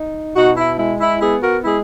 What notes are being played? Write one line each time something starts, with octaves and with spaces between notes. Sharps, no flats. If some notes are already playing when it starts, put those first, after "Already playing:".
Already playing: D#4
B2 D#4 F#4
E4
G#3 E4
E4
B3 E4 G#4
F#4 A#4
G#3 E4 G#4